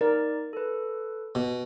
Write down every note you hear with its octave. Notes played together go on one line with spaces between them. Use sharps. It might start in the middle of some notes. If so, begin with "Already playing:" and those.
D#4 A#4 D5
A4 B4
B2